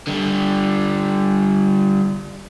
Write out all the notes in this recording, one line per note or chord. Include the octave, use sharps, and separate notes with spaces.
D3 G3